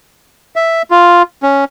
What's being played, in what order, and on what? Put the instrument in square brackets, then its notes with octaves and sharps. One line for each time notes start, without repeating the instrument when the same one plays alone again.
[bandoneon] E5
F4
C#4